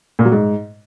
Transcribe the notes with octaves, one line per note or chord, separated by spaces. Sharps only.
A#2
F#3
G#2